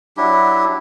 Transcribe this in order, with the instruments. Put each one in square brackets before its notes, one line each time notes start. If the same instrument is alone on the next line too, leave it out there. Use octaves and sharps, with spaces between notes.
[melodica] F#3 D4 E4 G4